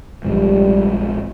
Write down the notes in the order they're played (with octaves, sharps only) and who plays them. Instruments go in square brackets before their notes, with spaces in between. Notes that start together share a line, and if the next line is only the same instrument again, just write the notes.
[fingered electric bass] A#1 G#2 F3 [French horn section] G3